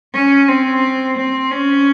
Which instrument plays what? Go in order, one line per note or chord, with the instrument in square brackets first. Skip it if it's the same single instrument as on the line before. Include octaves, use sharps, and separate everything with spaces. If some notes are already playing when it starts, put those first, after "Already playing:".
[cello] C#4
C4
C4
C#4